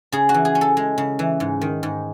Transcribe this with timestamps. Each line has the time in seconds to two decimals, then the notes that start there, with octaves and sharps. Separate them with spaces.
0.12 C#3 G#4
0.29 F#4
0.34 E3
0.45 G#4
0.55 C#4
0.61 A4
0.77 G#3
0.98 C#3
1.19 E3
1.40 G#2
1.61 D#3
1.83 G#2